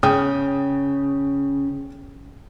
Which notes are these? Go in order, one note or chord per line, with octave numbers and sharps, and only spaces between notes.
C#3 G5 D#6